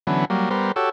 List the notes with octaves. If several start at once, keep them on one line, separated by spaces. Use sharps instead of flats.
D3 E3 F#3 B3 C#4
F#3 G3 A#3
G3 B3 A#4 C5
F#4 G4 A4 C#5 E6